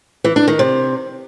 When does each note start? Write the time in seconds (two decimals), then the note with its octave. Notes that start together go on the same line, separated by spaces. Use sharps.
0.24 E3
0.36 D4
0.48 D#3
0.59 C3